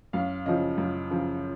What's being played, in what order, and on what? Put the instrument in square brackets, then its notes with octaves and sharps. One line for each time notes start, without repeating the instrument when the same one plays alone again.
[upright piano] F#2 F5
C#3 F3 D#5
F#2
C#3 F3